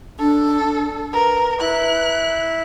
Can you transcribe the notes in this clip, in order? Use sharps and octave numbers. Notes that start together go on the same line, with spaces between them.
D4 A4
A#4 B4
E4 F#6